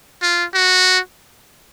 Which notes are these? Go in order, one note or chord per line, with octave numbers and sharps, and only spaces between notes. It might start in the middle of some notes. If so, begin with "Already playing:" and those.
F4
F#4